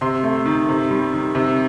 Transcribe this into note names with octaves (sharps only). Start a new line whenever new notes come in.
C3 C6
A3
D#3
C3
G3
D#3
C3